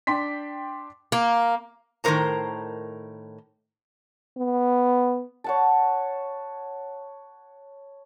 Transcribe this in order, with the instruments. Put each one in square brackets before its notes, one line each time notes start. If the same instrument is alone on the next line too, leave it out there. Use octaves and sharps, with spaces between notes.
[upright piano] D4 G5 C6 B6
[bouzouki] A#3
[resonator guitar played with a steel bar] A2 D#3 C#4 A#4 C5 A#5
[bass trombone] B3
[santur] C#5 F#5 A5